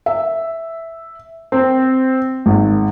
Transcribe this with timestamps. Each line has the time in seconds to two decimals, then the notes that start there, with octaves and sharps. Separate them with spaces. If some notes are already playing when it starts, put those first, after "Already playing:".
0.06 E5
1.52 C4
2.46 G#1